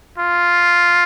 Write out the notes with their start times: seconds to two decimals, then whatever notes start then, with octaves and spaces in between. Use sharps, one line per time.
0.18 F4